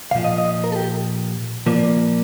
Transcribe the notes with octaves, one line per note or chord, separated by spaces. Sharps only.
C2 A#2 F3 F5
D#5
D#5
A#4
A4
G4
A#2 F3 A#3 D5